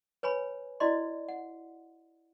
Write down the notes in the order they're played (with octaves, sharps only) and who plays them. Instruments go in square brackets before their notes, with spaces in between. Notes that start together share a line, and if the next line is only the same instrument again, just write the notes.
[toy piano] B4 C#5 G#5 B5
E4 F#4 D5 D#5 C6
F#5